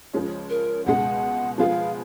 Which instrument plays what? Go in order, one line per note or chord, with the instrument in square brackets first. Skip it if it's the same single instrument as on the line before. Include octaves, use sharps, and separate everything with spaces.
[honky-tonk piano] C#2 C#3 F3 G#3 C#4
[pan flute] A#4
[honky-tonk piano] C#2 B2 G#3 [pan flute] F#5
[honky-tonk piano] F3 G#3 B3 F4 G#4 [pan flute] F5